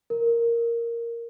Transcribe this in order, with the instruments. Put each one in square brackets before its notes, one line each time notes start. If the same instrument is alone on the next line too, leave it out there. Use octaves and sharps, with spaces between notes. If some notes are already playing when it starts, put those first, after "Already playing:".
[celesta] A#4